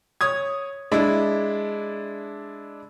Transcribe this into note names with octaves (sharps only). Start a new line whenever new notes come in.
C#5 D#6 G#6
G#3 D4 E4